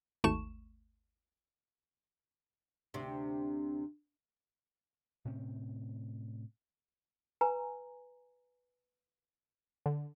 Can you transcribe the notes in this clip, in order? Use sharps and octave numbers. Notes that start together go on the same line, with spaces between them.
G#1 D#2 A3 C#6 E7
D2 C3
A2 C3 C4 C#4
B4 G#5 A#5
D3